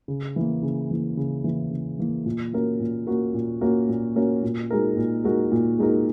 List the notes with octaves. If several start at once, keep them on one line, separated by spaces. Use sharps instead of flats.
C#3
E3 A#3
C#3
E3 A#3
C#3
E3 A#3
C#3
E3 A#3
A#2
A#3 C#4 F#4 A#4
A#2
A#3 C#4 F#4 A#4
A#2
A#3 C#4 F#4 A#4
A#2
A#3 C#4 F#4 A#4
A#2
G#3 D#4 F#4 A#4
A#2
G#3 D#4 F#4 A#4
A#2
G#3 D#4 F#4 A#4